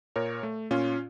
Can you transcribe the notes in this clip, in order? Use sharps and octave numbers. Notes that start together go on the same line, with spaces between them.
A#2 A#4 C#5
A3
A#2 C#4 F4